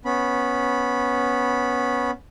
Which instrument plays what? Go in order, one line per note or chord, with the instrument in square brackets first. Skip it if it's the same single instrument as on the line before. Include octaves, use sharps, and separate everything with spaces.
[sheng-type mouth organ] B3 C#4 B5